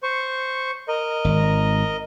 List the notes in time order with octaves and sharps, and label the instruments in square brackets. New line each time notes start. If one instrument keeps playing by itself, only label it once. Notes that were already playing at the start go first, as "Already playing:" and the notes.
[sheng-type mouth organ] C5 C#6
A#4 D#5
[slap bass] G#1